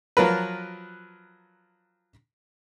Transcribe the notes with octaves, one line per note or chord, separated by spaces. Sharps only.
F3 F#3 F4 A#4 B4